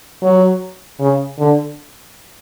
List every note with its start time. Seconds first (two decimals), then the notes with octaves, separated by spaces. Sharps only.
0.23 F#3
1.00 C#3
1.39 D3